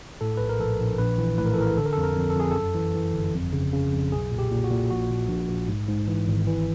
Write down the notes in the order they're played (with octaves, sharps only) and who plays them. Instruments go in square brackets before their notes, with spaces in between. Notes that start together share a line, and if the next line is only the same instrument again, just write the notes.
[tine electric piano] A2 A4
A#1 B4
A#4
A#1 A4
A#1
A#1 B4
E3
A2 B4
A#4
A4
E3 A#4
D3 A4
A#4
A4
F2
A#4
F2
A4
F2 G#4
F#2 A4
E3
E3
G1
F2
C#3
C#3
F2
B1 G#4
A#2
G4
A#2
F#4
A#2
A#1 F#4
A#1
A#1
A#1
G#2
G#2
E3
G#1
E3